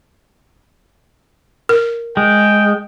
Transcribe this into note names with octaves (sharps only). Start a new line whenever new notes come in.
A#4
G#3 G5